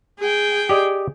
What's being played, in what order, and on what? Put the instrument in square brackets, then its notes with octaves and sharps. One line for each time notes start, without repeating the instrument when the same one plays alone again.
[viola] G#4 G5
[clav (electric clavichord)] G4 D5 D#5